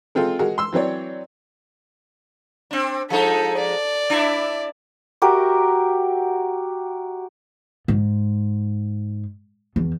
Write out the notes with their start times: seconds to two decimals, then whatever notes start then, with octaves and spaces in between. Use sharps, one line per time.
0.15 G#3 C4 F4 A4
0.39 G#3 F#4 G#4 A#4
0.58 C6 E6
0.73 E3 F#3 C4 C#5 D5
2.71 C4 D4
3.10 F3 G#3 D#4 A4
3.58 D5
4.10 D4 E4
5.22 F#4 G4 A#4 E5
7.88 G#2
9.76 E2